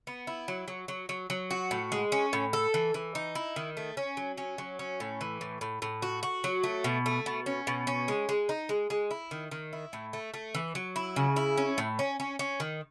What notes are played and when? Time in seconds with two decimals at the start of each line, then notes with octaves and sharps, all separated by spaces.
0.07 B3
0.27 E4
0.48 F#3
0.68 F#3
0.88 F#3
1.09 F#3
1.30 F#3
1.51 F#4
1.71 A2
1.92 G#3
2.12 C#4
2.33 A2
2.53 A4
2.74 E3
2.94 E3
3.15 D#4
3.35 E4
3.56 D#3
3.77 A3
3.97 C#4
4.17 F#3
4.38 C#4
4.58 F#3
4.79 C#4
5.00 A2
5.21 E3
5.41 A2
5.61 A2
5.82 A2
6.02 F#4
6.23 F#4
6.44 F#3
6.64 A3
6.84 B2
7.06 A3
7.26 B2
7.46 C#4
7.67 B2
7.87 C#4
8.08 G#3
8.29 G#3
8.49 D#4
8.69 G#3
8.90 G#3
9.11 E4
9.31 D#3
9.51 D#3
9.73 E4
9.93 A2
10.13 A3
10.34 A3
10.55 E3
10.75 F#3
10.96 E4
11.16 C#3
11.36 E4
11.58 C#4
11.78 A2
11.99 C#4
12.20 C#4
12.39 C#4
12.60 D#3